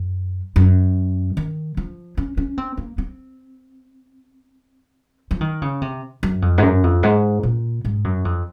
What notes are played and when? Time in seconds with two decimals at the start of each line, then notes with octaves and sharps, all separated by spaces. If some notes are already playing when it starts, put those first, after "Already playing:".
Already playing: F#2
0.56 F#2
1.37 D#3
1.77 F3
2.17 C#4
2.37 C#4
2.58 C4
2.77 A#3
2.98 C4
5.31 F3
5.41 D#3
5.62 C#3
5.81 C3
6.23 F#2
6.42 F2
6.58 G#2
6.62 F#2
6.83 F2
7.03 G#2
7.43 A#2
7.85 G#2
8.04 F#2
8.25 F2